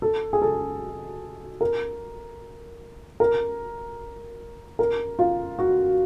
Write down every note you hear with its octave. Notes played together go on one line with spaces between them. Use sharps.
A4
G#4
A4
A#4
A#4
A#4
F4
F#4